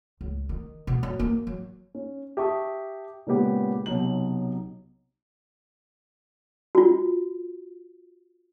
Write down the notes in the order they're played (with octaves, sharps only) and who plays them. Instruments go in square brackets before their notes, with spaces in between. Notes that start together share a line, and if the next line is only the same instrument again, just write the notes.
[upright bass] C#2
D#3
B2
F#2
A#3
F#3
[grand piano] C#4
G4 E5 A5 C#6 D#6
A#2 C#3 G#3 B3 G4
B1 C3 F#3 D#4 F#7
[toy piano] F4 F#4